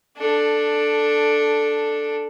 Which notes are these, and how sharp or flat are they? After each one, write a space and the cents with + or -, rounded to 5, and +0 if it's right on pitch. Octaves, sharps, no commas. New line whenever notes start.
D4 +5 A4 +0